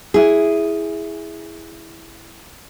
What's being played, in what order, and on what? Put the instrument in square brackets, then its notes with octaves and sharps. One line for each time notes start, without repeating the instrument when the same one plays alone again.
[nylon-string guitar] E4 G#4